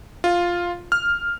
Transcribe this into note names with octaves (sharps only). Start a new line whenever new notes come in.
F4
F6